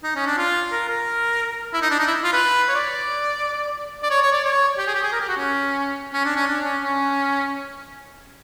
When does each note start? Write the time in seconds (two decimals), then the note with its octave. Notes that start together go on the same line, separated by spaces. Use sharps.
0.04 D#4
0.16 C#4
0.27 D4
0.38 F4
0.72 A#4
0.89 A#4
1.74 E4
1.82 D#4
1.90 D4
1.99 D#4
2.07 E4
2.24 F4
2.33 B4
2.68 C#5
2.75 D5
4.03 D5
4.10 C#5
4.22 C#5
4.33 D5
4.45 C#5
4.78 G4
4.87 G#4
4.95 G4
5.03 G#4
5.12 A#4
5.21 G4
5.28 F#4
5.37 C#4
6.13 C#4
6.25 D4
6.36 C#4
6.47 D4
6.64 C#4
6.81 C#4